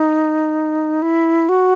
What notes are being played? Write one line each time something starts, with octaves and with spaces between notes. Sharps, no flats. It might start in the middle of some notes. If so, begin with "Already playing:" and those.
Already playing: D#4
E4
F#4